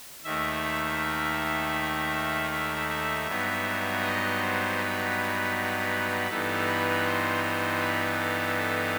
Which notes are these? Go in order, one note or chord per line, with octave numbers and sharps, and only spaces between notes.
D#2 D#3 A3 E5
E5
E5
G2 F#3 B3 D#4
D#5
C5
B4
G2 E3 B3 D#4 A4
B4
C5
C5
B4
A4
A4